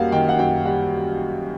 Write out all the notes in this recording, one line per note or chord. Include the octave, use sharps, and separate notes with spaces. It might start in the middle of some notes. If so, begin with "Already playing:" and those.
Already playing: F#2 G3 A#3 F5 F#5
D#3 G5
F#5
F#2 G5
G3 F#5